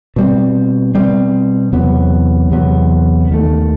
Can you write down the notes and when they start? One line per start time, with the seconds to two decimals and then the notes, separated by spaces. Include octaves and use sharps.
0.16 B2 G3 C4
0.95 B2 G3 C4
1.73 E2 C3 F#3 B3
2.51 E2 C3 F#3 B3
3.30 D#2 D#3 A3